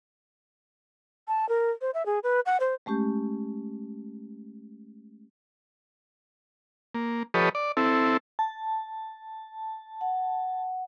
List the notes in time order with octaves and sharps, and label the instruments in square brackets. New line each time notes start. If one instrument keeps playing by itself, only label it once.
[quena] A5
A#4
C5
E5
G#4
B4
F#5
C5
[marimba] G#3 A3 C#4 G4 G6
[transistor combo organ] A#3
F3 G4 A4 B4 C#5 D#5
D5
C4 E4 A4
[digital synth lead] A5
[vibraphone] F#5